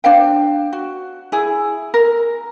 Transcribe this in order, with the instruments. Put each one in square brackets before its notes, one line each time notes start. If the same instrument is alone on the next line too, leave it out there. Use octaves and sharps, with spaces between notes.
[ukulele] D4 C5 F5 G5
F#4
E4 G#4
A#4